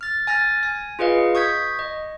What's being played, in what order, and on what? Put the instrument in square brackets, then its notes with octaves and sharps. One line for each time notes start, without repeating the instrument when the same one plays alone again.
[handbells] F6 A6
G#5 F6 A6 A#6
G#5
F4 G#4 B4 D#5 F5
C#6 D#6 G6 G#6 B6
D#5